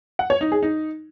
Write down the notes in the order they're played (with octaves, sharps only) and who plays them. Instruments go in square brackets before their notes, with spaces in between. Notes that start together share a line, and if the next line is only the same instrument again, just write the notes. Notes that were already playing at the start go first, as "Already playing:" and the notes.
[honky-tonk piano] F#5
C#5
D#4
G#4
D#4